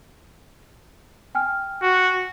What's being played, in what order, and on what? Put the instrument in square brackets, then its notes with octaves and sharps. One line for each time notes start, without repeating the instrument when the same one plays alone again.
[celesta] G5 G#5 F6
[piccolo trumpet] F#4